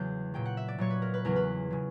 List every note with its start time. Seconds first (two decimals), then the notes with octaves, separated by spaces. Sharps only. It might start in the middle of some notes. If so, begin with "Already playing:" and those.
Already playing: E2 C#3 F#3 G6
0.34 A#2 F#3 G5
0.45 F#5
0.57 E5
0.68 D5
0.78 A#2 F#3 C#5
0.90 B4
1.02 A#4
1.14 B4
1.25 E2 C#3 F#3 A#4
1.36 B4
1.70 C#3 F#3